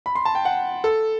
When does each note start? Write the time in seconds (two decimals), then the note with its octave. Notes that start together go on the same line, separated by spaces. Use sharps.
0.06 B5
0.15 C6
0.25 A5
0.35 G5
0.45 F#5
0.84 A4